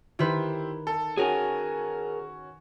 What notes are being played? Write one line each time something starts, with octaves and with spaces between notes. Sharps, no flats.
D#3 E4 G4 B4 C5
A4
C#4 F#4 G#4 A#4 G#5